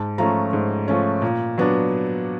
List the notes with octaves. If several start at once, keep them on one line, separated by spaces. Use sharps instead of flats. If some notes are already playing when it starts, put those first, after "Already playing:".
Already playing: G#2 A5
F3 A3 C#4 A#5
G#2
F3 A3 C#4
A#2
F#3 B3 D4